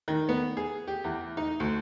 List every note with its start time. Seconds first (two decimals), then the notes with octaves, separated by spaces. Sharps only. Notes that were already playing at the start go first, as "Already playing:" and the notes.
0.08 D#3
0.29 B3
0.57 G#4
0.87 G4
1.04 E2
1.37 D#4
1.60 D2